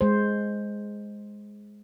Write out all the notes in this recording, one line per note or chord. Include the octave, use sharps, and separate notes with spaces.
G#3 C5